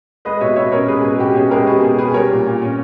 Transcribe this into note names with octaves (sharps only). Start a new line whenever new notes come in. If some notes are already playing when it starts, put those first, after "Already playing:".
G#3 B4 D#5
B2 C#5 E5
B2 C#5 E5
C#4 A#4 C#5
G#3 G#4 B4
B2 G#4
B2 G4
C#4 G#4
G#3 G4 A#4
B2 G#4 B4
B2 G#4
C#4 G#4 B4
G3 A#4 C#5
A#2
A#2
C#4